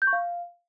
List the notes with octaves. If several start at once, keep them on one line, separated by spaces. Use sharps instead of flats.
G6
C#6
F5